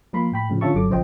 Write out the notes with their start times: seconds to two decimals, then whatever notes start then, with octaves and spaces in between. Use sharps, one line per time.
0.13 F3 A#3 A#4 B5 C6
0.32 A2 G5 B5
0.50 A2 C#3 F3
0.61 D3 C#4 F4 E5 A5 C#6
0.74 G1 F#3 A4 D6
0.89 A#1 C#3 F3 C5 D#5 G5